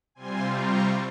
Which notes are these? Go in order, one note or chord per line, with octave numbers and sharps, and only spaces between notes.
C3 G3 C4 F4 G#5 C6
A#5 C#6